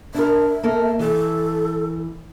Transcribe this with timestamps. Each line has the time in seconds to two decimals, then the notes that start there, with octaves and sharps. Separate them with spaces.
0.14 D4 A#4 E5
0.63 A#3 A4 A#4
0.99 E3 A4